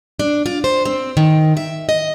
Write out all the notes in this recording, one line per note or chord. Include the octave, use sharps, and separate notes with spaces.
D4
F4
C5
C4
D#3
E5
D#5